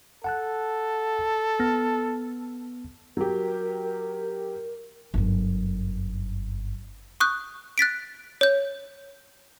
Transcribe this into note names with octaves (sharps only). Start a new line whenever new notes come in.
A4 F#5 A5 F#6
B3 F6 A#6
F#3 G4 A#4
G1 F#2
C#6 D#6 F#6 G6
F#6 A6 B6 D7
C#5 G6